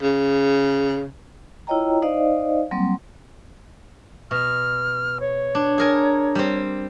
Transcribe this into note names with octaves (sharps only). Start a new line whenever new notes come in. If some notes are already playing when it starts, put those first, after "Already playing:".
C#3
E4 F4 C#5 D#5 G5 A#5
D#4 C5 D5 D#5 F5
F#3 G3 A#3 C4
B2 F6
C#5
D4
G#4 A#4 G#5
G3 C4